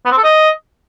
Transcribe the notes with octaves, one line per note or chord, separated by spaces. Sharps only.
B3
C4
A4
D#5